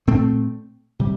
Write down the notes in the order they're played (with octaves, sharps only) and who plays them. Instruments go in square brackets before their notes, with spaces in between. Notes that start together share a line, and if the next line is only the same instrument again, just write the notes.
[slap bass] A#2 A3 C4
C3 G3